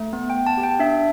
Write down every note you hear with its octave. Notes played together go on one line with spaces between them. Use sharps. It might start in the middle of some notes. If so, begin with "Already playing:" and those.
Already playing: A3
B3
G5
B3
A5
G4
G5
D4 E5